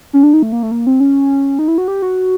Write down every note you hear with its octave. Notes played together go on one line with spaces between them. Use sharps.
C#4
D4
D#4
A3
A#3
A3
A#3
C4
C#4
D#4
E4
F#4
G4
F#4